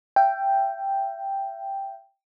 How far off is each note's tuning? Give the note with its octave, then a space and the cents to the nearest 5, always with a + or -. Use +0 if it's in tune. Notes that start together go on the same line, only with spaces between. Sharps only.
E5 +30 G5 +0